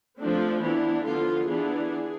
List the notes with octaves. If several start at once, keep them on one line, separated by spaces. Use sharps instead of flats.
F3 A3 C4 D4
E3 B3 D4 E4
D3 F3 B3 F4
E3 B3 D4 G#4